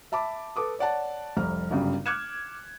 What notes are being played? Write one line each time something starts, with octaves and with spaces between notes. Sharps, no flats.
E5 A5 B5 D6
A4 B4 D6 D#6
C#5 D5 F#5 A5
F1 C2 F6
G1 F#2 C#3 G3
D6 F6 F#6 G#6 C#7 E7